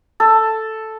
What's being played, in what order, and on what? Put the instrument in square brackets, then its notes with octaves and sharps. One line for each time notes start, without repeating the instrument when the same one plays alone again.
[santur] A4